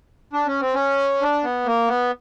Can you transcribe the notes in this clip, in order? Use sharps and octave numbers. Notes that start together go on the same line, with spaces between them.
D4
C#4
C4
C#4
D4
B3
A#3
B3